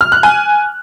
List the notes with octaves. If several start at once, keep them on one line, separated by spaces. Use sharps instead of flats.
F6
F#6
G#5